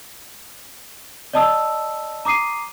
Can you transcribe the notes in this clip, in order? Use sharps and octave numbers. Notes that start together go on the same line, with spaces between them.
D5 D#5 A5 D#6 E6
A#5 D6 D#6 C7 D#7